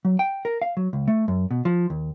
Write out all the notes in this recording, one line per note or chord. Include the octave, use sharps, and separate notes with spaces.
F#3
G5
A#4
F5
F#3
C#2
A3
F#2
B2
F3
D#2